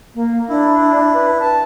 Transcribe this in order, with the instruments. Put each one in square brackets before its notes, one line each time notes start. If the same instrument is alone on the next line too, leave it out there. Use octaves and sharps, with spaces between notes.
[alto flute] A#3
[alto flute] D4 [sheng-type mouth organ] E4
[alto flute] B4
A5